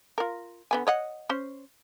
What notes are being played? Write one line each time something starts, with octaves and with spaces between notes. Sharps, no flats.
F4 A#4
D3 B3 G#5
C#5 D#5 F#5
C#4 C5